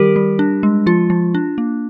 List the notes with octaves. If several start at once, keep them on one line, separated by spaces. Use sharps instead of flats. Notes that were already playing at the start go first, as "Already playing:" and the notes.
Already playing: D#3 G3 G4 A#4
G3
D4
G#3
F3 F4
F3
D4
A#3